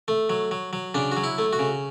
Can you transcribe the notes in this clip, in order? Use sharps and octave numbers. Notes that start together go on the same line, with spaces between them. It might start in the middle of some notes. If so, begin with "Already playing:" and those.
A3
F#3
F#3
F#3
C#3 D4
F#4
F#3
E4
A3
F#4
C#3